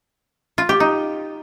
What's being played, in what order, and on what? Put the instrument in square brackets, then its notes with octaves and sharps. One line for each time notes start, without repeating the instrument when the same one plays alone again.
[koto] F4
G4
D#4